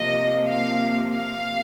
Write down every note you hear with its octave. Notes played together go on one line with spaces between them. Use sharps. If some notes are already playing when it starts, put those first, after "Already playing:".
Already playing: C3 F3 A#3 D#5
F5
F5